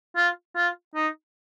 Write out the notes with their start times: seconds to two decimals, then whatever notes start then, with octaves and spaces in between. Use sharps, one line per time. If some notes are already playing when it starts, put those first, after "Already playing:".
0.16 F4
0.56 F4
0.95 D#4